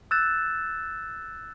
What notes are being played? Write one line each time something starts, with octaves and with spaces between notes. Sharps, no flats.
E6 F#6 G6 A6 E7